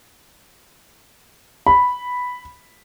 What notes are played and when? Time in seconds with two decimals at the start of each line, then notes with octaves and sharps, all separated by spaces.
1.67 B5